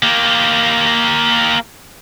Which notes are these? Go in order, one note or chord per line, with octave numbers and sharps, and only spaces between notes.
A#3 G4